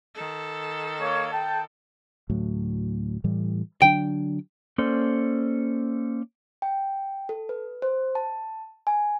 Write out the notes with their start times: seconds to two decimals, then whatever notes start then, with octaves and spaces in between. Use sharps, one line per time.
0.15 D#3 A4
1.01 A#3 C#5
1.33 G5 A5
2.30 D2 A2 F#3
3.24 A2 E3 G3
3.82 D3 F#3 D4 G5
4.78 A#3 C#4 A4 C5 D5
6.62 G5
7.29 A4
7.49 B4
7.82 C5
8.15 A5
8.87 G#5